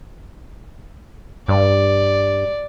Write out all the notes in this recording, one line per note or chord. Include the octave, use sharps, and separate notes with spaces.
G2 D5